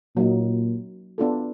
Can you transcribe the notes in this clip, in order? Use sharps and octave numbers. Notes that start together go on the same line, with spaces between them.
A#2 F#3 A#3 D#4
B3 D4 F4 A4